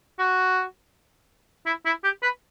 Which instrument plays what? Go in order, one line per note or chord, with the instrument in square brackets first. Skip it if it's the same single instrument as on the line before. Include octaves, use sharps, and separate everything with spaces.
[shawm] F#4
E4
E4
G4
B4